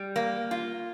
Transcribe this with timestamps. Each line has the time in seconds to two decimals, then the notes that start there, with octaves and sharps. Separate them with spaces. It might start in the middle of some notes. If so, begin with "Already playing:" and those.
Already playing: G3
0.16 A#3
0.51 F4